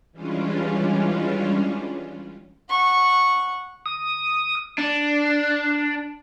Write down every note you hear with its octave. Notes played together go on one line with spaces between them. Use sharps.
E3 G3 G#3 C#4 D4 F4
F#5 C#6
D#6
D4